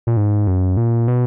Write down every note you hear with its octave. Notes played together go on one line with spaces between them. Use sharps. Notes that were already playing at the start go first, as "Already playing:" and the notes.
A#2
G#2
F#2
A#2
B2